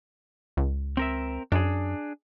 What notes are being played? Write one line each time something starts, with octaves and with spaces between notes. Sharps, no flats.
C#2
C4 A#4 E5
F#2 D4 G#4